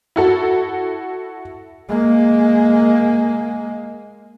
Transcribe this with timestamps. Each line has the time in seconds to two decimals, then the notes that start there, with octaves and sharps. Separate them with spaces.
0.16 E4 F#4 A4
1.89 G#3 A#3